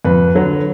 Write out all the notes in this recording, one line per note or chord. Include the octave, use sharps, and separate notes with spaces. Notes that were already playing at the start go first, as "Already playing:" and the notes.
F2 B4
D3 F#3